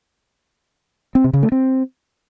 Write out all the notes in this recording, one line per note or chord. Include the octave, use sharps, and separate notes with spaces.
C4
C3
C#3
A3
C4